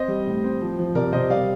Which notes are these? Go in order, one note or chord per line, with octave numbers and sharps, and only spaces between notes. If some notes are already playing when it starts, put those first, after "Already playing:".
Already playing: C4 C5 D#5
G3
A2
C4
F3
F3
C3 A#4 D5
C3 C5 D#5
G3 D5 F5